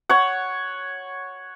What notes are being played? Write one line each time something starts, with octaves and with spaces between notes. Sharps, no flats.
C#5 F#5